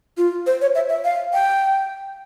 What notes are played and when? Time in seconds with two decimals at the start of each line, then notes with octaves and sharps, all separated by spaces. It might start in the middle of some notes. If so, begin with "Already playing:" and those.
0.17 F4
0.47 C5
0.61 C#5
0.75 E5
0.89 E5
1.04 F5
1.33 G5